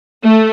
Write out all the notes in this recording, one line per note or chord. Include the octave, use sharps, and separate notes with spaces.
A3